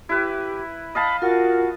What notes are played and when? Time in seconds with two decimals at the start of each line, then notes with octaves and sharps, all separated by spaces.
0.09 E4 G4 B4
0.95 D#5 F5 A5 B5
1.22 F4 F#4 A#4